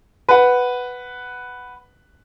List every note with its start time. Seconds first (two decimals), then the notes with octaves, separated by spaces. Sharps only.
0.29 B4 F#5